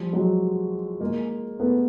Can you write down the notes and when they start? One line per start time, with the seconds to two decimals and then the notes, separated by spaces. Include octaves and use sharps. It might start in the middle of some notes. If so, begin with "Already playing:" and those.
Already playing: F3 G3
0.13 F#3 G#3
1.01 G#3 A#3
1.60 A3 B3